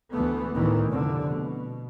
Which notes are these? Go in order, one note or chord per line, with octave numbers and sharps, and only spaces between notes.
D2 E3 A3 B3
D2 A2 D#3 E3
F1 A#2 D3
B2